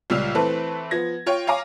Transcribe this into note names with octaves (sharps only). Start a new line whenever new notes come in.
C#2 A#2 G3 E6 F6
E3 A3 C4 A4 B4
F3 B3 G#6 A#6
F4 C#5 G5
C#5 F5 G#5 A#5 D6